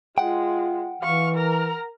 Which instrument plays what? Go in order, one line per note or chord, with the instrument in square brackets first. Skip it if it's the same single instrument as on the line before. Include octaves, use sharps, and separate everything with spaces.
[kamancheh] G#3 [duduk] F4 [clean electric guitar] F#5 G5
[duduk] E3 [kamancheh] F5 C#6
[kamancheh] A#4 A#5